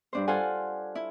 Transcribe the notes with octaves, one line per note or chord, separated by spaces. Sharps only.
G2 D4 C5
F4 A4 C5 F5 F#5 G#5
E4